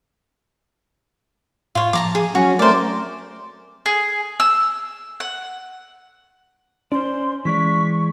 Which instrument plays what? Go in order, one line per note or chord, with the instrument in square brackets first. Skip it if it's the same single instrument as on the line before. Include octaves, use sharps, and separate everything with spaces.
[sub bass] A2 [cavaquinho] F4 C#5
[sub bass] F3 [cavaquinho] A5 A#5 D6
[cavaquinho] G#4
[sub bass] F#3 [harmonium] C#4 [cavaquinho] F#4
[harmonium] A3 C4 A#4 [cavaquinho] C5 D5
[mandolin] G#4
E6
F#5
[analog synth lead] C#4 [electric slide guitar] C5 D5 [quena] C6
[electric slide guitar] E3 G#3 D5 [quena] C#6 [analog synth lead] B6